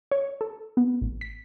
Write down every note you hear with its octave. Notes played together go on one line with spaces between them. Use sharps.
C#5
A4
B3
A1
B6